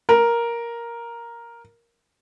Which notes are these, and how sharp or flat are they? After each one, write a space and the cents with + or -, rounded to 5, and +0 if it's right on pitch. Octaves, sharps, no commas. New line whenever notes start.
A#4 +5